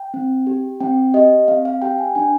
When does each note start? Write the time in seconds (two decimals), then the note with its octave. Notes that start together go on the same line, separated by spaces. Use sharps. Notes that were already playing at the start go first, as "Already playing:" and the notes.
Already playing: G5
0.14 C4
0.47 G4
0.80 C4 G5
1.14 G4 D#5
1.48 C4 F5
1.65 F5
1.82 G4 G5
1.98 G#5
2.15 D4 G#5